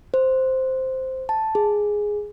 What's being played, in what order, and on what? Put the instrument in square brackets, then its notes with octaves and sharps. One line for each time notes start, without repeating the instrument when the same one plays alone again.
[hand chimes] C5
A5
G#4